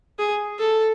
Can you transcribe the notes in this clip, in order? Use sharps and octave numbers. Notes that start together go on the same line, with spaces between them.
G#4
A4